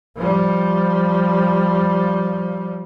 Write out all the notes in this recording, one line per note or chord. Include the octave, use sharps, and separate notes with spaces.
F3 G3